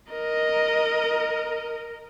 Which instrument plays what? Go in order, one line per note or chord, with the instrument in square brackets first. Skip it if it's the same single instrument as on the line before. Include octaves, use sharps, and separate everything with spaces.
[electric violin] A#4 D#5